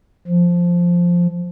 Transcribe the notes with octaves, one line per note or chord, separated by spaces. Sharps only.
F3